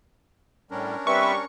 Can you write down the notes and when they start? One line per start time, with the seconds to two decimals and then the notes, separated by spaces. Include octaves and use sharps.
0.71 A2 G3 C#4 D4 A#4
1.07 G3 C4 B4 E5 C#6